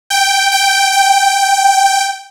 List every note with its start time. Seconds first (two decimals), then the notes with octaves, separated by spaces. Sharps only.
0.10 G5
0.52 G5
0.92 G5